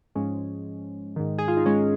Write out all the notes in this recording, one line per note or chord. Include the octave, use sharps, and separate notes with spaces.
G#2 F3 G#3 C#4
G#2 D#3
G#4
F4
D#4
G#3 C#4